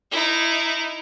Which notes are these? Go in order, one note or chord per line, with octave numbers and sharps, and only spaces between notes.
D#4 E4